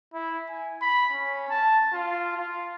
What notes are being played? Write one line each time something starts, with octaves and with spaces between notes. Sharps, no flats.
E4
G#5
B5
C#4
A5
F4
F4